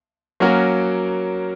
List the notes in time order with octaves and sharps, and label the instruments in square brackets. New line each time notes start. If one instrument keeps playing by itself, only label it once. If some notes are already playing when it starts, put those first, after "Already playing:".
[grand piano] F#3 A#3 C#4 F#4 A#4